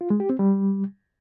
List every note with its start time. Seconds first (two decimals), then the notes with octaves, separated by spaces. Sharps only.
0.01 F4
0.10 G#3
0.20 G4
0.30 C4
0.39 G3